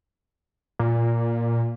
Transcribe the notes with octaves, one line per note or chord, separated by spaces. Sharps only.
A#2